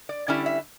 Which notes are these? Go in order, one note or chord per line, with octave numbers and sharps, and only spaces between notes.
D5
D3 G3 C#4 E4 D5
E5